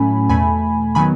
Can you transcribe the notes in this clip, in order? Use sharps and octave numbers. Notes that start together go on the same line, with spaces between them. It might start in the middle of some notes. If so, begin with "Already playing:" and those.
Already playing: A2 F#3 A3 C#4 G#5 B5
E2 B2 A3 G#5 B5
D#3 F#3 B3 G#5 B5